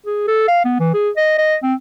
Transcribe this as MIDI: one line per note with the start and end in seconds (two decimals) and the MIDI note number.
0.06 0.24 68
0.28 0.46 69
0.48 0.62 77
0.65 0.79 59
0.80 0.89 52
0.94 1.10 68
1.17 1.34 75
1.38 1.55 75
1.63 1.74 60